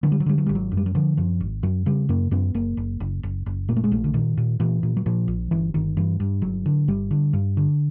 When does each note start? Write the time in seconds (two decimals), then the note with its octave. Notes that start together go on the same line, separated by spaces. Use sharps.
0.03 D3 F#3
0.12 G3
0.20 F#3
0.26 D3 G3
0.38 F#3
0.46 G#1 G3
0.55 F#3
0.71 F#2
0.77 G3
0.86 F#3
0.95 D3 F3
1.17 F#2 F3
1.40 G#1
1.63 F#2 F#3
1.86 C#3 G3
2.09 F#2 A#3
2.31 F#2 B3
2.55 F#1 A#3
2.77 F#1
3.00 F#1
3.23 F#1
3.46 F#1
3.69 A#2 A#3
3.76 A3
3.84 G#3
3.92 A#1 A3
4.04 D3
4.14 A#2 D#3
4.37 A#2
4.60 A#2 E3
4.83 A#2
4.97 F#3
5.06 A#2 F3
5.28 A#1
5.51 G1 E3
5.74 G1 D#3
5.97 G2 E3
6.20 G2
6.42 G1 F#3
6.66 D3
6.88 G1 G3
7.11 D3
7.33 G2
7.57 D3